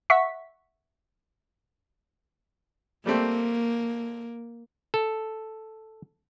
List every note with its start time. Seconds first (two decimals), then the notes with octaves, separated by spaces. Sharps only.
0.10 E5 F#5 C#6 B6
3.06 G3 A3 A#3 C4
4.94 A4